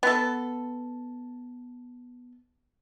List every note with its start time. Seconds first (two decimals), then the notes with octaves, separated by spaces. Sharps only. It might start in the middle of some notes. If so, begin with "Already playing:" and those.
0.03 B3 A4